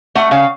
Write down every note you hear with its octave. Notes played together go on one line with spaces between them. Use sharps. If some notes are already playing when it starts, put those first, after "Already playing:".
A3 F#5
C#3 F5